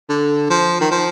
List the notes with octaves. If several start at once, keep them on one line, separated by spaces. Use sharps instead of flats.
D3
F3
D#3
F3